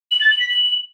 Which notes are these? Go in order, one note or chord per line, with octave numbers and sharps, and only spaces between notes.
F#7
A6
F#7
B6
F#7